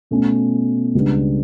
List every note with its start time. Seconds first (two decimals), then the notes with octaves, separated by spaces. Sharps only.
0.11 B2 A3 C#4
0.95 C#2 C#3 G3 B3 D4